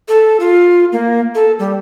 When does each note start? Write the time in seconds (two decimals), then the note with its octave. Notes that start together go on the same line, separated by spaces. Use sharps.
0.08 A4
0.40 F4
0.92 A#3
1.35 A4
1.59 G3